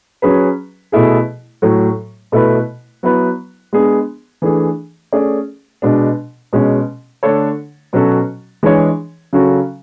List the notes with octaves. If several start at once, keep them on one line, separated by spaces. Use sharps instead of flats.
F#3 C#4 G#4 B4
B2 A3 E4 G#4
A2 F#3 A3
B2 A3 E4 B4
F#3 B3 E4 B4
G#3 B3 D4 G#4
E3 A3 D4 G#4
A3 C#4 G#4 D5
B2 G#3 D4
B2 G#3 C#4
D3 A3 D4 A4 C#5
B2 F#3 C#4 F#4 A4
E3 G#3 D4 G#4 C#5
C#3 F#3 C#4 F#4 A4